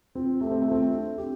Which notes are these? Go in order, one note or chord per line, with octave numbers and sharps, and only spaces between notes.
C4 F4
A3 G4
C4
A3
C4 F4
A3
D4
C4 G4